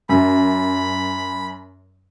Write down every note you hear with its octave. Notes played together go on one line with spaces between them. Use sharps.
F#2 B5